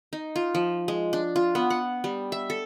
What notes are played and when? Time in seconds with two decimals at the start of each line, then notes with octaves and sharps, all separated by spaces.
0.13 D#4
0.36 F4
0.55 F3
0.88 G#3
1.13 D4
1.36 F4
1.55 B3
1.70 F#5
2.04 G3
2.32 E5
2.50 A4